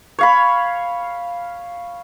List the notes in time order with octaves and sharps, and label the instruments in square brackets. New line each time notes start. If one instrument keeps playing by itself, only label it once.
[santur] C#5 F5 B5